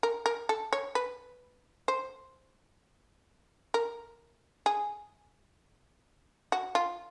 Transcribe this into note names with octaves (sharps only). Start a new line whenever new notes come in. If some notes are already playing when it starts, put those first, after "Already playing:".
A#4
A#4
A4
C#5
B4
C5
A#4
G#4
F#4
F4